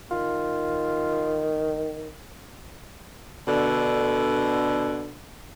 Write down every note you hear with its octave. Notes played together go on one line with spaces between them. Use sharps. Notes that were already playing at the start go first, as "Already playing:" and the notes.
D#3 F4
B2 D3